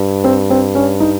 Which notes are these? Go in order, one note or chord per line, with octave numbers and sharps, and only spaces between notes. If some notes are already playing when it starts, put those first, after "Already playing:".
Already playing: G2
C4
C4
C#4
D#4